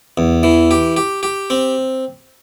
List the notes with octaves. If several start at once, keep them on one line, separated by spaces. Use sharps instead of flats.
E2
E3
G4
G4
G4
C4